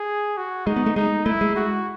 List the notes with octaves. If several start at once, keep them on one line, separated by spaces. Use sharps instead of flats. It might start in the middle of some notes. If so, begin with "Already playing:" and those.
Already playing: G#4
F#4
G#3 D#4
B3
A3
G#3 D#4
A3 E4
G#3
F#4